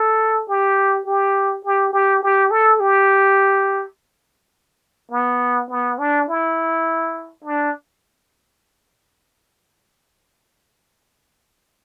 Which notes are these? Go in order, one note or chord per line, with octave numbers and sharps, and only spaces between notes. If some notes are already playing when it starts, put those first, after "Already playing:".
Already playing: A4
G4
G4
G4
G4
G4
A4
G4
B3
B3
D4
E4
D4